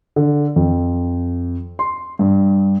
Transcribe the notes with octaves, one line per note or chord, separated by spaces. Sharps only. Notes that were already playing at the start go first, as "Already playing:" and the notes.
D3
F2
C6
G2